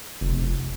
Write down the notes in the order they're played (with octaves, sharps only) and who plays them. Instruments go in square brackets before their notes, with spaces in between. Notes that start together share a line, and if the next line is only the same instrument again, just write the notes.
[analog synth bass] F1